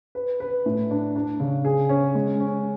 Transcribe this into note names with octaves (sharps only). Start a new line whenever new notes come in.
B4
B4
A2
D4
D4
C#3
G#4
C#4
G#3
C#4